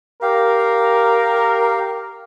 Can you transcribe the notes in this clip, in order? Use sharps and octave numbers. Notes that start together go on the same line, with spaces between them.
G4 A#4 F5